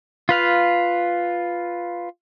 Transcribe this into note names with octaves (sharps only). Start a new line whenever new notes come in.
F4 B4 F5